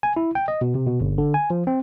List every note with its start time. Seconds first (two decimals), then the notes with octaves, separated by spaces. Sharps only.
0.03 G#5
0.16 E4
0.35 G5
0.48 D#5
0.61 B2
0.75 C3
0.87 B2
1.01 G1
1.18 D3
1.34 G#5
1.50 F3
1.67 C4